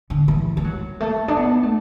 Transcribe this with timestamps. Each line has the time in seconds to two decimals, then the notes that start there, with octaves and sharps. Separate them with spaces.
0.10 D3
0.28 E3
0.57 A3
0.64 F#3
1.00 A3
1.28 D4
1.37 B3
1.63 A3